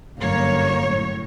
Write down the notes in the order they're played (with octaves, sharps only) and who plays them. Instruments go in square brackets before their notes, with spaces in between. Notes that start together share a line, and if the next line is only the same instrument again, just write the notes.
[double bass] G1 A#3 [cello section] F#2 C#5
[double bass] A2